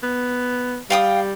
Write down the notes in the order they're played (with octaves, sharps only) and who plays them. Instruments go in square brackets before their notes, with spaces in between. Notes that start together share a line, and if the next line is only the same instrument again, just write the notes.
[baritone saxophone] B3
[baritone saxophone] G3 [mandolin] F5 G5 D#6